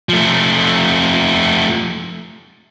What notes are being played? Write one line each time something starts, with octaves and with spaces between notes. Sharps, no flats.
F3 A3